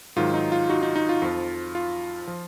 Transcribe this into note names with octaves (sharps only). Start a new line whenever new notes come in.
G#2 D#3 F#3 F4
D#4
F4
D#4 F#4
D#4
D#4
F4
F2 F3
F4
F3